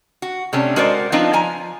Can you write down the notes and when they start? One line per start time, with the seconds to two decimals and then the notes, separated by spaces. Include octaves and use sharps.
0.22 F#4
0.53 C3 A3 C#4 D4
0.76 G#3 F#4 A#4 C5 D5
1.12 F3 B3 C4 D4 D#4 F4
1.33 F3 G#5 A#5